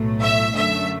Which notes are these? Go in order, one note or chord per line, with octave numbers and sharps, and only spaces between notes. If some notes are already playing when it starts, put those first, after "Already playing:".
Already playing: B1 A2 F#3 A3
E5
F#2 D3 A3 E5